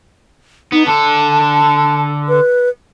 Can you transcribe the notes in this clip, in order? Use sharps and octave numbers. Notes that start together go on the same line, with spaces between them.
B3 D#4
D3 A4 A5
B4